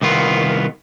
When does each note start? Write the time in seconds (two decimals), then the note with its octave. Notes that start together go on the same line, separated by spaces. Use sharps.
0.01 C2 D#3 B3 F4